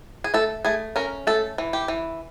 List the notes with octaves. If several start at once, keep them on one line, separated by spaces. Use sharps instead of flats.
G#4
A3 A4
A3 G#4
C#4 A#4
A3 A4
E3
G4
E3